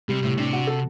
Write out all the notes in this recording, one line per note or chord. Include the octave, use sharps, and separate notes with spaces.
C3 G3
A2 C3
C3 D4
F#4
A4